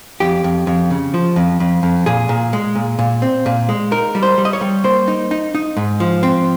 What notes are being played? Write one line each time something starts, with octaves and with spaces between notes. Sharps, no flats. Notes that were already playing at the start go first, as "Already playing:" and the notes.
F2 G4
F2
F2
C#3
F3
F2
F2
F2
A#2 G#4
A#2
G#3
A#2
A#2
C4
A#2
G#3
D#4 A#4
G3
C5
G3
D#5
C#5
G3
A#3 C5
D#4
D#4
D#4
G#2
F3
C4